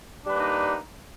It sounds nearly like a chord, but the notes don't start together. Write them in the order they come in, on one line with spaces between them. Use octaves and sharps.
D4 G3 B4 A#3 D#4